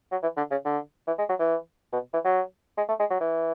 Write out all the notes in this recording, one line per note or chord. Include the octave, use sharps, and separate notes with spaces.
F#3
E3
D3
C#3
D3
E3
G#3
F#3
E3
B2
E3
F#3
G#3
A3
G#3
F#3
E3